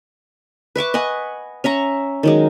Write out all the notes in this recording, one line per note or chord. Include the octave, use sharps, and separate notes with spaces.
B4 E5 C#6 D6
D#5 F#5 G#5 C#6
C#4 E5 A#5 C#6
D#3 F#3 G#3